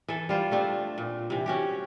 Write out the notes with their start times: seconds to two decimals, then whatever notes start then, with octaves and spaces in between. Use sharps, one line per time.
0.08 E3 A4
0.29 G3 F4 C5
0.51 A3 C4 D4
0.98 A#2
1.30 C3 E3
1.46 C#4 F#4 G4